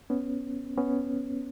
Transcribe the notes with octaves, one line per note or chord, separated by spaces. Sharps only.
B3 C#4
B3 C#4